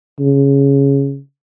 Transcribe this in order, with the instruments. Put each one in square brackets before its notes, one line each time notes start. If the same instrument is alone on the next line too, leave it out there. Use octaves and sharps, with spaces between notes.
[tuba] C#3